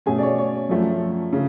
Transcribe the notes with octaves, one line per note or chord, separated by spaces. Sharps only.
B2 A3 C#4 G#4 G#5
D5
C#5
C#5
F#2 F3 A3 C#4
C#3